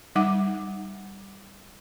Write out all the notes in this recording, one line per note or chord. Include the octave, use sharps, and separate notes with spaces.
G3 D#4 F#5 D6